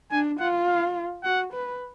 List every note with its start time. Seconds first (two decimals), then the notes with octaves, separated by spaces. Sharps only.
0.11 D4 G#5
0.39 F4 F#5
0.67 F5
1.23 F#4 F#5
1.53 B4